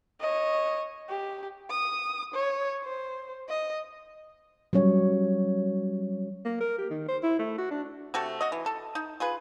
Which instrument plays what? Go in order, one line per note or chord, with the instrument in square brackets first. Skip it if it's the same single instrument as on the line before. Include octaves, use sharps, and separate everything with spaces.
[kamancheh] C#5 D#5
G4
D#6
C#5
C5
D#5
[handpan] F#3 G3 C#4 C#5
[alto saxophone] A#3
A#4
G4
D#3
C5
E4
A3
F#4
D4
[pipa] C3 A3 F#4 A4
F#4 D#5
E3
A4
D#4
F4 G#4 B4